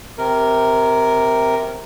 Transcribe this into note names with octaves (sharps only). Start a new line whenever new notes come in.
C3 A#4